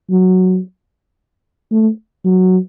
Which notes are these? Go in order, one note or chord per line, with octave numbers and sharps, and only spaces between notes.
F#3
A3
F#3